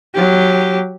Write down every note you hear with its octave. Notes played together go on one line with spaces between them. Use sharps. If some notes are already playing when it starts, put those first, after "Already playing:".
F#3 G4